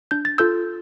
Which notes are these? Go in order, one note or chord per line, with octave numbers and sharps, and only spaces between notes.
D4 G6
A6
F4 A4 E6 G6